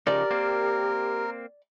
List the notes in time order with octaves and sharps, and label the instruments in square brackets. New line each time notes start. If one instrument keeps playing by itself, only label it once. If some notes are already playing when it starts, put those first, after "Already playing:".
[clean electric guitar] C#3 F3 D#4 [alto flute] G4 [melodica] A#4 [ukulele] D5
[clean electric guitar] A#3 C4